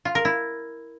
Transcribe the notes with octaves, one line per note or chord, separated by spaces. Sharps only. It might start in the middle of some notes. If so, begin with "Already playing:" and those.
F4
A#4
E4